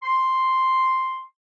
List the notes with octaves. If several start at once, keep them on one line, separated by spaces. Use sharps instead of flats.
C6